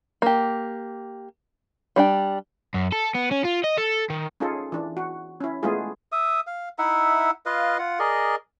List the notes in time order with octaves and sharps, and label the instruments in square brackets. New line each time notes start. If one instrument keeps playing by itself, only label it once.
[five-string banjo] A#3 G4
G3 D4 G5
[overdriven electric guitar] F#2
A4
B3
C#4
F4
D#5
A4
D#3
[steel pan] C#4 D#4 F4 G#4 A4
E3 D4
F#4
C#4 E4
G#3 A3 B3 E4 F4 G#4
[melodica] E5 D#6
F5
D#4 E4 E5 F#5
F4 B4 D#5 F5
F4 F#5
G#4 A#4 D5 D#5